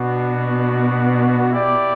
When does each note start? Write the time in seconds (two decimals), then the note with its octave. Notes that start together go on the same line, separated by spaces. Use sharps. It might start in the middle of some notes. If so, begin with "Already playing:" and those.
Already playing: B2 B3 D4 F#4
1.50 E4 G4 D5